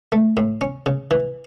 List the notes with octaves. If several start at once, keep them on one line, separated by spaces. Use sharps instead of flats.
A3
A2
C#4
C#3
E3